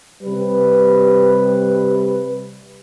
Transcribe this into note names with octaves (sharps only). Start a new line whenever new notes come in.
C3 G3 B4